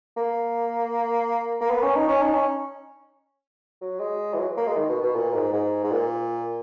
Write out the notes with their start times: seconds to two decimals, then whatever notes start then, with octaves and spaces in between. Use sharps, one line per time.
0.17 A#3
1.61 A#3
1.71 B3
1.82 C#4
1.96 D#4
2.08 C#4
2.22 D#4
2.34 C#4
3.81 F#3
4.00 G#3
4.34 E3
4.39 F#3
4.57 A#3
4.67 G#3
4.77 D#3
4.89 B2
5.03 B2
5.16 A#2
5.34 G#2
5.53 G#2
5.84 G#2
5.92 A#2